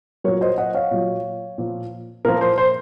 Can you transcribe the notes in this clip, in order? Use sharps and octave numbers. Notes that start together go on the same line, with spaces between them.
A#2 F#3 A#4 C#5
C5 D#5
D#5 F#5
C#5 F5
A#2 F#3
A#2 F3
A#2 F3 A#4
C5
C5